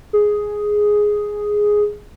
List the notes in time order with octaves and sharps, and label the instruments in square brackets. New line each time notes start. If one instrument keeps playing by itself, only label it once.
[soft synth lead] G#4